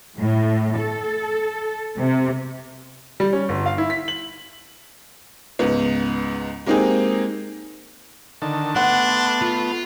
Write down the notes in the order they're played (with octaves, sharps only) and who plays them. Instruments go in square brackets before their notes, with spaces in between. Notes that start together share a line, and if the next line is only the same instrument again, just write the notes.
[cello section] A2
A4
C3
[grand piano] G3
C#4
G1
F5
E4
B6
F#7
[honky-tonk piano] C#2 G#2 B3
G#3 A#3 C4 D#4 G4 G#4
[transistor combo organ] D3 D#3 A5
[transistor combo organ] A3 B3 [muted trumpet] D4 [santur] F#5 [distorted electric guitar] C6
[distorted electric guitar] F4